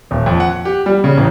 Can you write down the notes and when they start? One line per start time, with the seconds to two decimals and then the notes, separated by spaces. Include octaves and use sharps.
0.11 D#1
0.26 F2
0.40 F#5
0.65 G4
0.86 G3
1.04 C#3
1.17 A1